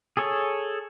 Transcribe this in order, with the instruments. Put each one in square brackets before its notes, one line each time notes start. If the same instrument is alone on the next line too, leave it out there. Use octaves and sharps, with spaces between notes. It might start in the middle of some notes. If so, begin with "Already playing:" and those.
[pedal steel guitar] G#4 A4 C#5